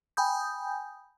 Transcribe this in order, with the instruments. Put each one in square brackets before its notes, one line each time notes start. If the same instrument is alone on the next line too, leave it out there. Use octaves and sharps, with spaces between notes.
[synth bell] G5 G#5 B5 D#6 G6